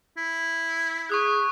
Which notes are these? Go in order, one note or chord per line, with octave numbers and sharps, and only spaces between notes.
E4
G#4 C#6 D#6 F#6